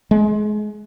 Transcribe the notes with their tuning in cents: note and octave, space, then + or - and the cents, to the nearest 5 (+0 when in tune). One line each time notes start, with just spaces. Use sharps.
G#3 +25